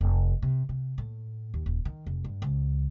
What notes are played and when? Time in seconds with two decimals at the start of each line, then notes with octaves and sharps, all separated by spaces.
0.01 F1
0.42 C3
0.69 C3
0.98 A2
1.54 D#2
1.66 D#1
1.85 D#3
2.07 F1
2.24 G2
2.42 C#2